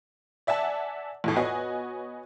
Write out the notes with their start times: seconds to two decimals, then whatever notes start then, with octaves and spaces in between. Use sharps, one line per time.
0.47 D5 E5 F#5 G#5 A5
1.24 A#1 E2 A2
1.36 B3 F#4 C#5 D#5 G#5